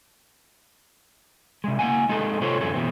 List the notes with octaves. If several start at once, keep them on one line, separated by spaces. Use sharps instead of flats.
C3 G#3
A#3 F#5 G#5
G#3 C4 D#4 G#4 A4
C3 F#3 F4 A4 C5 C#5
F#2 D3 G#4 A4
B2 E3 C4